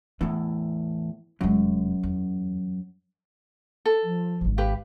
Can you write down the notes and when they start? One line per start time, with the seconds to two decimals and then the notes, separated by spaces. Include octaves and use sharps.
0.21 E2 A2 E4
1.41 F1 F#2 G#3
2.03 E2
3.86 A4
4.03 F3
4.41 D1 G#1
4.58 G4 B4 F5